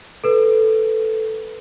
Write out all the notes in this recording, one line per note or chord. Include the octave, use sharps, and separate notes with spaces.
A4 B4